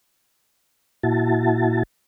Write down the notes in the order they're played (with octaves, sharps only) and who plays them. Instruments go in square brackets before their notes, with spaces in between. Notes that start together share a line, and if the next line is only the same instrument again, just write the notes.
[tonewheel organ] A#2 E4 F#4 A5